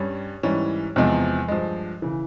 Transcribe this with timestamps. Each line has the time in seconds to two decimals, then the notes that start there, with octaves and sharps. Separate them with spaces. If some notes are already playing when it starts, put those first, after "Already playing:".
Already playing: G2 G3 C#4
0.43 G#2 E3 G3 C#4
0.96 E2 C3 F3 G#3 C4
1.48 G2 F3 G#3
2.02 C#3 E3